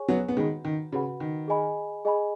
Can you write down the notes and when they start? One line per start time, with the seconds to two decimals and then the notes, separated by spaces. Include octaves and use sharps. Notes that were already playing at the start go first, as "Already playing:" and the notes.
Already playing: G#4 C#5 G#5 C#6
0.08 F#3 B3
0.28 B3
0.37 D#3 G#3 F#4 B4 F#5 B5
0.65 D#3
0.92 C#3 F#4 B4 F#5 B5
1.20 D#3
1.48 G#4 D#5 G#5 B5
2.05 G#4 D#5 G#5 B5